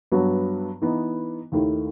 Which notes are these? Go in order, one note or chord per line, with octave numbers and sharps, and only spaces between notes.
G2 F#3 B3 F#4
E3 B3 D#4
D#2 D#3 A3 E4